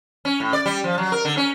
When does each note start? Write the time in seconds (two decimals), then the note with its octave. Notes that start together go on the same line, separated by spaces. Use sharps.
0.25 C#4
0.40 A2
0.53 D5
0.66 G3
0.84 F3
0.98 F#3
1.12 A#4
1.25 D3
1.37 C#4